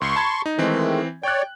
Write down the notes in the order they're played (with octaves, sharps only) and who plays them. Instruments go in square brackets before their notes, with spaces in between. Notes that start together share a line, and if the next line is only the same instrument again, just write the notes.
[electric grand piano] C#2 [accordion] C6 C#6
[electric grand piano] A5 B5 G#6
D#4
[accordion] D#3 G#3 A3 [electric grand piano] E3 C4
[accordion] C#5 D5 [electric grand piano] G5 F#6